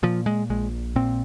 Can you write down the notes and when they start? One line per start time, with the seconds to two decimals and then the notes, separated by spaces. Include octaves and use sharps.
0.03 A#2 F3
0.26 G#3
0.50 A#1 G#3
0.96 A#2 C4